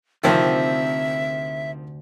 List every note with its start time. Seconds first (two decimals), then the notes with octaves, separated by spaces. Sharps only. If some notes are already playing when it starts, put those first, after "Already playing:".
0.24 D2 C3 D#3 F3 C4 E5